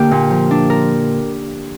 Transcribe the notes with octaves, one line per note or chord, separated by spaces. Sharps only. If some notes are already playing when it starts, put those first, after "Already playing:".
Already playing: D3 A#3 G4
A#2
F3
D4
A#4